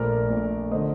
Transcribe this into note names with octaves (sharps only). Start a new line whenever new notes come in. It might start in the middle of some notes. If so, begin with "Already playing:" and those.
Already playing: A#1 A#2 A3 A#4 D5
A#1 A#2 A3
D3 A3 C5 D#5